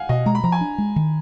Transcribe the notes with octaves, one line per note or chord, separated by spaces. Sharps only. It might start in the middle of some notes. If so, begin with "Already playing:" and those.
Already playing: F5 F#5 G#5
B2 D#5
G#3 A#5
B5
F3 A#5
G#5
D4
G#3
D#3